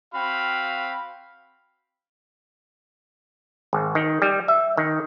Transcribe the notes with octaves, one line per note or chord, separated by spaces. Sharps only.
C4 F#4 F5 G5 B5
G#1
D#3
G3
E5
D#3